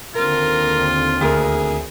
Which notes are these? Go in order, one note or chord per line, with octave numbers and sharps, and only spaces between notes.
D#2 D3 C4 F4 A#4
D2 G#4 A#4